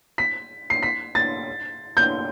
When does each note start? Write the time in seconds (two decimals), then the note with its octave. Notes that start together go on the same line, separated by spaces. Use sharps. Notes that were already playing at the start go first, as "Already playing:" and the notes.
0.18 B6
0.70 C7
0.83 B6
1.15 A6
1.97 G6